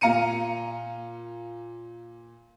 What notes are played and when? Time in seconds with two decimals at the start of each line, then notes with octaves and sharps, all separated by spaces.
0.01 A#2 F5 A#5 C#7 D#7